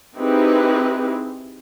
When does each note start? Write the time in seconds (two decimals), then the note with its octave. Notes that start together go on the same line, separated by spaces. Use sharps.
0.17 C4 D#4 E4 G4 G#4 B4